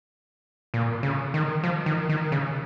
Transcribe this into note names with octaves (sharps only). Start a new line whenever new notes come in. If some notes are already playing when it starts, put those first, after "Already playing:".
A#2
C#3
D#3
F3
D#3
D#3
C#3